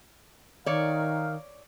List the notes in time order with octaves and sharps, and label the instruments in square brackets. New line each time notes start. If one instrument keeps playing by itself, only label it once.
[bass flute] D#3 [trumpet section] D#4 A#4 F5 [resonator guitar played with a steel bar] C#5 D5